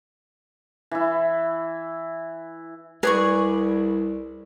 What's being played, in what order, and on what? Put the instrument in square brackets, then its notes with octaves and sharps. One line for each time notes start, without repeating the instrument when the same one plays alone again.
[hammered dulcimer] E3 E4
[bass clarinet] C2 [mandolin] G#4 D5 C#6 [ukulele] B4